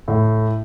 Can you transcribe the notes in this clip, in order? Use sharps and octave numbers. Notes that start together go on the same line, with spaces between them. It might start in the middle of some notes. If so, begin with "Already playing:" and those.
A2